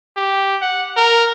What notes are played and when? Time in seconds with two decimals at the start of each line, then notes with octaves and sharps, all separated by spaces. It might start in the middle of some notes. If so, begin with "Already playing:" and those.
0.17 G4
0.62 F#5
0.97 A#4